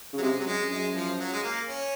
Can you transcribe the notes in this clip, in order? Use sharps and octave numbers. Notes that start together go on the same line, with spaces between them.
C#3
F#3
C3 G#3
F#3
F#2 G#3
F#2 G#3
F3
F#3
G#3
A#3
C#4